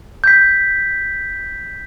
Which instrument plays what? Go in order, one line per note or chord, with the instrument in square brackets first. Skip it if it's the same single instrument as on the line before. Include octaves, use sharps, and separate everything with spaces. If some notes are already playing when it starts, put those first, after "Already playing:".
[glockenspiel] G6 B6